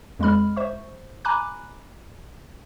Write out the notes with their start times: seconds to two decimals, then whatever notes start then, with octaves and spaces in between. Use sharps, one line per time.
0.19 F2 G#3 D#5 B5 F6
0.56 C5 E5 C#6
1.25 G#5 A#5 B5 D6 F#6